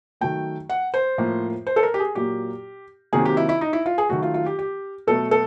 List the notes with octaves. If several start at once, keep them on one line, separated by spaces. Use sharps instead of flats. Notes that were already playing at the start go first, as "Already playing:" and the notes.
D#3 F#3 A3 G5
F#5
C5
A2 F3 A#3
C5
A4
A#4
G4
G#4
A#2 F#3 A#3 G4
C3 D#3 F#3 A#3 G#4
G4
E4
E4
D#4
E4
F4
G#4
D#3 F#3 A3 F#4
F4
F4
G4
G4
B2 F#3 A3 A4
A4